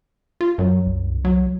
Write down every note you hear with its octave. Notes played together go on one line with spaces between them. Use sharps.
F4
F#2 F#3
C2
F#3